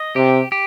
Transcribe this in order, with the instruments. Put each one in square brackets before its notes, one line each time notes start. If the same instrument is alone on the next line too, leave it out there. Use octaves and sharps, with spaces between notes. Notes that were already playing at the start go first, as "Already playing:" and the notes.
Already playing: [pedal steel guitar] D#5
[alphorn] C3 [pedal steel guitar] G4
[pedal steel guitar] G4